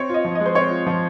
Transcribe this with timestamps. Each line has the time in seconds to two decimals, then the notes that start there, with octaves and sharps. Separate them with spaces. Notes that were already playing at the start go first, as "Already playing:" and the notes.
Already playing: C4 C#5
0.09 F4 D#5
0.25 F3
0.35 D#5
0.40 G#3
0.46 C5
0.55 C4 C#5
0.70 F4
0.86 F3